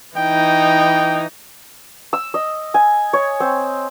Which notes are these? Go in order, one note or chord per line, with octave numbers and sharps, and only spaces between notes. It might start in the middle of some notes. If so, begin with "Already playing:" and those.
E3 D#4 G5
E6
D#5
G#5
C#5
C4